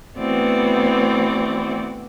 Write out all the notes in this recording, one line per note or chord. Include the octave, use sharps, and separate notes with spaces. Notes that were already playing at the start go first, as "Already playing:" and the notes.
E3 A3 B3 C4 F#4 D5